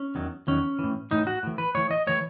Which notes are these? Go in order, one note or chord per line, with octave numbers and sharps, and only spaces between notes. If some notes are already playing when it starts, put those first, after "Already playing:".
Already playing: C#4
E2 D#3 F#3
E2 D#3 F#3 C#4
A2 E3
A2 E3 D#4
F#4
A2 E3
B4
A2 E3 C#5
D#5
A2 E3 C#5